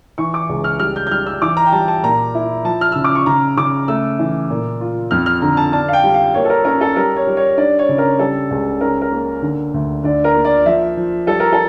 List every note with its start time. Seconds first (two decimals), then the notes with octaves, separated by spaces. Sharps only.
0.18 E3 C#6
0.34 D6
0.49 C#2
0.64 F6
0.79 G3 F6
0.96 G6
1.07 G6
1.11 G3 F6
1.26 E6
1.42 E3 D6
1.57 A#5
1.66 G5
1.72 G3 A5
1.88 A5
2.03 A#2 A#5
2.35 E4
2.65 F3 A5
2.81 F6
2.92 C#3 E6
3.04 D6
3.15 C#6
3.26 C#3 A#5
3.57 C#3 D6
3.88 A3 E6
4.19 E3
4.50 A#2
4.81 F4
5.11 F2 F6
5.26 F6
5.42 D3 A#5
5.57 A5
5.72 D4 A5
5.88 F5
5.93 G5
6.04 G3
6.14 F5
6.34 A#3 C#5
6.45 A4
6.50 A#4
6.65 C#4 A#4
6.81 A4
6.96 G3 A#4
7.16 C#5
7.27 G3
7.37 C#5
7.57 D4 D5
7.79 C#5
7.89 C#3
7.98 A#4
8.19 G3 A4
8.51 C#2
8.81 C#4 A#4
9.01 A#4
9.12 A#3
9.42 D3
9.74 D2
10.04 D3 D5
10.24 A#4
10.34 A#3
10.45 D5
10.66 F3 E5
10.97 F3
11.27 G3 A4
11.40 A#4
11.52 A4